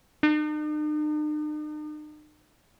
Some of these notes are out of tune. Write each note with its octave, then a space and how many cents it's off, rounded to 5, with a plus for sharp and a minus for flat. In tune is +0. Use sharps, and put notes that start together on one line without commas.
D#4 -45